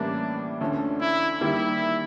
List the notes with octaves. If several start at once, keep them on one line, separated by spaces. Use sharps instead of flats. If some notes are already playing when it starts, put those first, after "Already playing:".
Already playing: A2 E3 G3 A#3 C#4 D4
D2 D3 F3 A3 C#4
E4
D#3 G3 A#3 E4